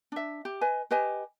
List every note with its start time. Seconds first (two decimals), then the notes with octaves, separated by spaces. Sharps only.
0.12 D4 E5
0.45 G4
0.61 B4 D#5 G#5
0.91 G4 B4 D#5 G#5